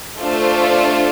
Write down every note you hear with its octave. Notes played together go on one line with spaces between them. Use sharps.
A3 D4 F4 C5